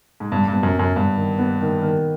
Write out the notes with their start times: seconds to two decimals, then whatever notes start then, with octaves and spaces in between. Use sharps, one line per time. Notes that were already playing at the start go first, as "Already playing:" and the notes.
0.20 G#2
0.32 G2 B3
0.48 G2
0.53 B3
0.63 F#2
0.75 F#2 B3
0.96 G2 B3
1.17 D#3
1.39 B3
1.61 D#3
1.82 D#3